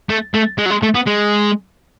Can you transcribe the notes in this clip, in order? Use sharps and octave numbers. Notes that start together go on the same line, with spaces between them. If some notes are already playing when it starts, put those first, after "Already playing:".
A3
A3
G#3
F#3
G#3
A3
B3
G#3